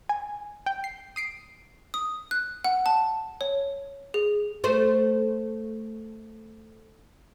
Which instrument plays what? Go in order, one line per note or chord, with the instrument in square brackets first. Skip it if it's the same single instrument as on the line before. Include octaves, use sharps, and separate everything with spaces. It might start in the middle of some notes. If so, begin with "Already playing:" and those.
[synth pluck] G#5
G5
C7
D#6 C7 D7
[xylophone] D#6
F#6
F#5
A5
C#5
G#4
[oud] A3 C5